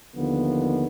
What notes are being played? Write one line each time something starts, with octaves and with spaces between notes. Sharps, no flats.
D#2 D3 F3 B3